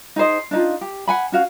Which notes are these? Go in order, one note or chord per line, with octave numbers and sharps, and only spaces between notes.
D#4 G#4 C5 D#5
D4 D#4 F4
G4
F#5 G#5 B5
C#4 F#4 F5